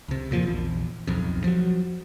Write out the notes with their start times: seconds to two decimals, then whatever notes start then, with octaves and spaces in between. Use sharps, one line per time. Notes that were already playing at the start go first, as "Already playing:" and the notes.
0.08 C#2 C3
0.31 E2 A#2 F3
0.43 A#1 E2
1.07 D1 B1 F2
1.44 F3 F#3